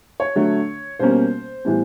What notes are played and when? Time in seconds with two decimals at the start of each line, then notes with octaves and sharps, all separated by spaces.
0.20 C#5
0.35 D3 F#3 A3
0.99 B2 G3 A#3 C#4 C5
1.65 A2 E3 G3 B3